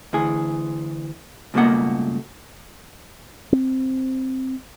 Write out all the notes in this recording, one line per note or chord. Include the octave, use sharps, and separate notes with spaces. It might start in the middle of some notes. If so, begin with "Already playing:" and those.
D2 E3 G#4
C#2 G2 B2 A3 A#3 F#5
C4